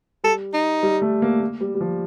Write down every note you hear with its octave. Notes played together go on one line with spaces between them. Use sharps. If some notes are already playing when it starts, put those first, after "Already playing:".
G3 A4
D#4
G3
A3
A#3
A#3
G3
G3
F3